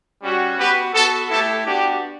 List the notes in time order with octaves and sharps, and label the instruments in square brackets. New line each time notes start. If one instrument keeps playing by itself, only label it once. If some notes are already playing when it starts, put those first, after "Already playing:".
[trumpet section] G3 C#4 F#4
B3 F#4 G4 B4
B3 F#4 A4
A3 E4 G4 A4
B3 D4 F#4 G4